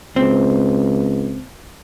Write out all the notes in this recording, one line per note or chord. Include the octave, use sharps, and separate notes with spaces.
C#2 C4